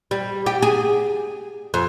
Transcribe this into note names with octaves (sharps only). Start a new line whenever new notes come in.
G3
G4
G#4
F2